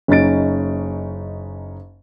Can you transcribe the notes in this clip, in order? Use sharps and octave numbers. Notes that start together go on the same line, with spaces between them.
F#1 C#4 D#4 A6 D7